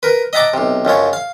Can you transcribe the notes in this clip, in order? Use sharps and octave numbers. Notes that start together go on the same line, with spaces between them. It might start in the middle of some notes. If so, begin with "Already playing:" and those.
A#4 B4
D#5 E5 F#5 A5 A#5 D6
B1 C3
C#2 F#2 F3 C#5
F5